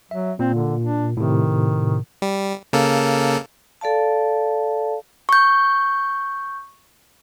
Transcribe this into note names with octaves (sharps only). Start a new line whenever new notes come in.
F#3 E5
A#2 C4
D3
D4
A2 C3 D#3
G3
C#3 A#3 A4
A4 D5 F5 A5
C#6 G6